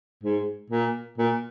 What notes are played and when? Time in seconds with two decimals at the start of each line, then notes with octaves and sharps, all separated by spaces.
0.23 G#2
0.70 A#2
1.18 A#2